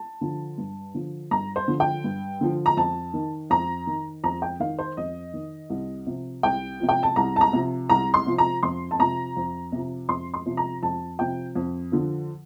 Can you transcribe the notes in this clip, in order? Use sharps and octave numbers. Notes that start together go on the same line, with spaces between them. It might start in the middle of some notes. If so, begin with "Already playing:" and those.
Already playing: A5
D3 F3
G2
D3 F3
G2 A#5
C5
D3 F3
G5
G2
D3 F3
A#5
F2 A5
D#3
F2 A#5
D#3
F2 A#5
G5
D#3 F5
C5
F2 D#5
D#3
C2
C3 F3
C2 G5
C3 F3
G5
A5
C2 A#5
A5
A#5
C3 F3
C2 A#5
C6
C3 F3
A#5
F2 C6
A5
C3 F3 A#5
F2
C3 F3
F2 C6
C6
C3 F3
A#5
F2 A5
C3 F3 G5
F2
D3 F3